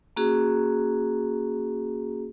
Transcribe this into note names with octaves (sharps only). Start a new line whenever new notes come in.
A#3 C#4 F#4 G#4